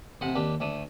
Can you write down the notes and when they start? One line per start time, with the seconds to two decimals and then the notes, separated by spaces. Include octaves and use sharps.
0.21 A1 C3 C5 D#5 F#5 B5
0.36 D#2 D4 G4 B4
0.60 D2 A3 D4 D#6